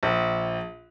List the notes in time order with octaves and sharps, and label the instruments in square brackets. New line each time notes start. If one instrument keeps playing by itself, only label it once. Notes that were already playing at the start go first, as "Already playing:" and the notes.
[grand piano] A#1